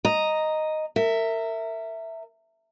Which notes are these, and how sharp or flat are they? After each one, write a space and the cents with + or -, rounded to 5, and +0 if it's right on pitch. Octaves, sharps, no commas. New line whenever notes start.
D#5 +0 A#5 +0
A#4 -35 E5 +0